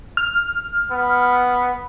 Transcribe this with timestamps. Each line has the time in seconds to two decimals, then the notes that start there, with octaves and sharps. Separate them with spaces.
0.17 F6
0.91 B3